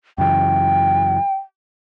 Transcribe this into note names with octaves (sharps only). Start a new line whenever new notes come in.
F#2 C#3 E3 G5